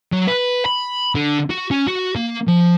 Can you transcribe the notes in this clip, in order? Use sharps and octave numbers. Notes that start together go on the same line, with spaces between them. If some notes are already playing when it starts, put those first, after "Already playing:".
F#3
B4
B5
D3
F#4
C#4
F#4
A#3
F3